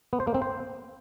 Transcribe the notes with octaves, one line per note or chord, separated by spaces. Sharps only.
B3
C5
A#3
C4
C5